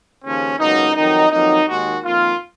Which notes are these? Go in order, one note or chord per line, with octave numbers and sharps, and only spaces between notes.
D#2 C#3 F3 C#4
C#2 B2 F#3 A#3 D#4
F2 D#3 F#3 D#4
F2 D#3 F#3 A#3 D#4
D#2 D#3 G#3 F#4
F2 D#3 A#3 F4